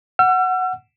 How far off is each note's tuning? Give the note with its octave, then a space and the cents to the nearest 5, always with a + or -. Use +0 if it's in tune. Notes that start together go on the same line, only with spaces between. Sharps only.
F#5 +0 E6 +45